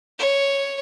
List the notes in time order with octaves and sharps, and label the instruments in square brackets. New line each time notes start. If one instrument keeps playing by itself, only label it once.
[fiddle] C#5